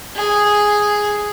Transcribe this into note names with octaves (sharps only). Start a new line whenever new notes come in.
G#4